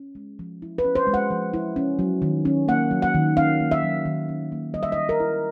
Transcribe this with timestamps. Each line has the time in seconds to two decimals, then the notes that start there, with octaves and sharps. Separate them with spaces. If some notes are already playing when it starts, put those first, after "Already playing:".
Already playing: C#4
0.15 G#3
0.39 F3
0.62 E4
0.78 B4
0.85 C#4
0.95 C5
1.07 G#3
1.14 F#5
1.31 F3
1.54 E4
1.76 C#4
1.99 F#3
2.22 D#3
2.45 C#4
2.68 A#3 F#5
2.91 F#3
3.02 F#5
3.14 D#3
3.37 C#4 F5
3.60 A#3
3.71 E5
3.83 F#3
4.05 D#3
4.29 C#4
4.52 A#3
4.74 G3 D#5
4.83 E5
4.92 D#5
4.98 D#3
5.09 A#4
5.20 E4